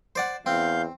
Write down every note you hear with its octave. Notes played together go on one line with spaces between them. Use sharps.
C5 D5 F#5
E2 C4 F5 G6